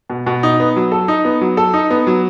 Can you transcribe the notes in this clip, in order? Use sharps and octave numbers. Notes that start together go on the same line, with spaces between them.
B2
B2
D#4
B3
F#3
A4
D#4
B3
F#3
A4
D#4
B3
F#3